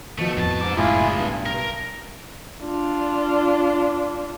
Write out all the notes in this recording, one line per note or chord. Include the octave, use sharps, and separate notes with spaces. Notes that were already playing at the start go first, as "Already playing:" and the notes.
B2 D#3 F3 A3
F2 A2 C#3 A5
G#2 D6
F#1 C2 A2 G#3 E4 F4 G#4
B1 G2
A#4
D4 F4